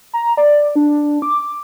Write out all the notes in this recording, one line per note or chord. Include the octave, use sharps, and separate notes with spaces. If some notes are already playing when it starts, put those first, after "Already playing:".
A#5
D5
D4
D6